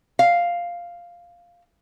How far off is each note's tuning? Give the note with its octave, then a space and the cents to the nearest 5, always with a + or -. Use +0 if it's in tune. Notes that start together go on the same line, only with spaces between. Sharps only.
F5 +0